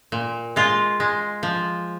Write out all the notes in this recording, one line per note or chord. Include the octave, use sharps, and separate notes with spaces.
A#2
G#3 F4
G#3
F3